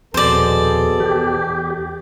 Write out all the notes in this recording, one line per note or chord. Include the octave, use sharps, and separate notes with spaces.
D#1 F2 B2 G#4 A4 C5 D5
E2 G4